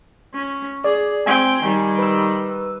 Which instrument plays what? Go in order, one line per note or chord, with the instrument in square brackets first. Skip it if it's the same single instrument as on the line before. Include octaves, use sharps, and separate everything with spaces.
[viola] C#4
[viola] G#4 [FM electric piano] D5
[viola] C4 G5 [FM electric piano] G#5 G#6
[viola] D#3 G3
[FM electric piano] B4 E6